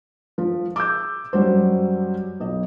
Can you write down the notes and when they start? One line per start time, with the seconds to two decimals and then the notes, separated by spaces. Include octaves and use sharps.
0.38 F3
0.76 D6 E6 G6
1.33 F#2 F#3 G3 C5
2.40 B1 D#5